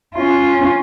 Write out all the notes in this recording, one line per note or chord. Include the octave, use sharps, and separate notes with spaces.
C#4 F4